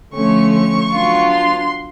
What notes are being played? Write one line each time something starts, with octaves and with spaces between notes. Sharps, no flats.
D3 F3 A3 C#4 C#6
C#6
F#3 B3 D4 F4
C6